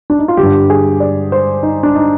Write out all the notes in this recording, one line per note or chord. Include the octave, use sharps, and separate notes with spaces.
D4
D#4
F4
D3 G4
G2
G#4
D5
C5
D#4
D4
D#4